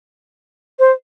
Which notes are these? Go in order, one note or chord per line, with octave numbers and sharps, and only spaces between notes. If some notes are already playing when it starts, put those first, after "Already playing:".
C5